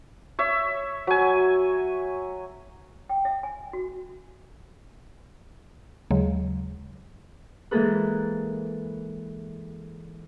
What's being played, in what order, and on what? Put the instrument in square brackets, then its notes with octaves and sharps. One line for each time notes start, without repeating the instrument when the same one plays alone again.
[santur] C#5 E5
F#3 G#5
[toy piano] G5
E5
G#5
F#4
[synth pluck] D#2 C#3 F#3 G#3
[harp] E3 G#3 A#3 G#4 A4 B4